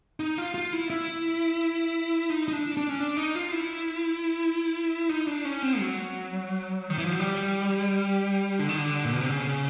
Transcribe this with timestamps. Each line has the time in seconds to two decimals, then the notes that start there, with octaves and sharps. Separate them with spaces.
0.20 D#4
0.38 F4
0.54 F4
0.73 E4
0.90 E4
2.30 D#4
2.48 D#4
2.53 D4
2.77 D4
2.89 C#4
3.00 D4
3.17 D#4
3.35 F4
3.52 E4
5.09 D#4
5.27 D4
5.45 C#4
5.63 C4
5.79 F#3
6.90 D#3
6.98 E3
7.05 F3
7.12 F#3
7.19 G3
8.59 D3
8.69 D#3
8.78 D3
9.05 A#2
9.13 B2
9.21 C3
9.29 C#3